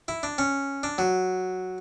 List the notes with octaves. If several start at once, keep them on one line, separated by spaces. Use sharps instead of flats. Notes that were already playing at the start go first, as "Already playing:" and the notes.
E4
D4
C#4
D4
F#3